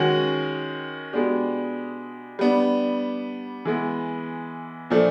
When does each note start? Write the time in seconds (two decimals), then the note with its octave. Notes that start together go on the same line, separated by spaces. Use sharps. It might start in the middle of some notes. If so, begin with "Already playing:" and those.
Already playing: D#3 G#3 C#4 F#4
1.13 B2 G#3 B3 D4 G4
2.39 G3 B3 D4
3.65 E3 G#3 B3
4.90 A#2 F3 A3 D4